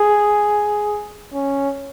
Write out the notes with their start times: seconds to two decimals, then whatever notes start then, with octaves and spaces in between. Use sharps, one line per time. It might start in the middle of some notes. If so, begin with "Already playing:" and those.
Already playing: G#4
1.34 C#4